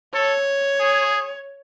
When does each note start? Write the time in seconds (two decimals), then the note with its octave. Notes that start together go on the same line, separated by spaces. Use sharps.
0.14 A4 C#5
0.80 G#4